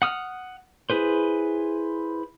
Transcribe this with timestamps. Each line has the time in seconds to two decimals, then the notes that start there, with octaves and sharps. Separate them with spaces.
0.02 F#5 D#6 F6
0.90 E4 G#4 B4 C5